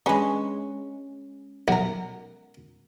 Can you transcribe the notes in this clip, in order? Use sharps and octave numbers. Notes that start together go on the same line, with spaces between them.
G#3 C#4 D4 B4
B1 F#4 A#4